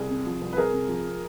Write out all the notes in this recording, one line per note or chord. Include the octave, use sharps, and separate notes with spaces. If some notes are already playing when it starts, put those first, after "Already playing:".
Already playing: C2 G#4
C3
F3
C2
B4
C2 G#4 A#4
C3
F3